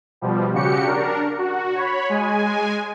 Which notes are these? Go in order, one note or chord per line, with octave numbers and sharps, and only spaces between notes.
B2 F3 G3
C#3 F#4 G4 C#7
D4 A#4
F#4
C#5 B5
G#3 G#5